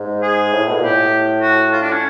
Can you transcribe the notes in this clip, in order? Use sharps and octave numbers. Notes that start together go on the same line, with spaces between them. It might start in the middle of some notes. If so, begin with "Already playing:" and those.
Already playing: G#2
G#4
A2
B2
A#2
A2 G4
F#4
F4
D4
C#4